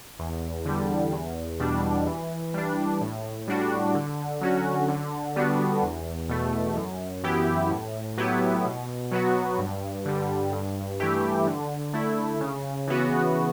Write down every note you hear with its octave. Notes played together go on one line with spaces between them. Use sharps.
E2
D3 G3
E2
B2 G3 D4
E3
G3 D4
A2
G3 D4 F#4
D3
F#3 C#4 F#4
D3
G3 B3 D4 F#4
E2
B2 A3
F#2
E3 B3 E4 G4
A2
F#3 B3 E4 G4
B2
F#3 B3 F#4
G2
D3 G3
G2
E3 A3 E4 G4
D3
A3 E4
C#3
E3 B3 F#4